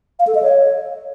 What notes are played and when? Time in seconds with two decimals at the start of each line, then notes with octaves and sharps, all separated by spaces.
0.19 F5
0.27 A4
0.35 D#5
0.43 C#5